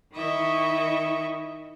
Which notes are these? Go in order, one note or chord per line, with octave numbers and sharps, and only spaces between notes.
D#3 E4 D#5 E5 C#6